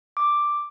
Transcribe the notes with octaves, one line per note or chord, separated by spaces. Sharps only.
D6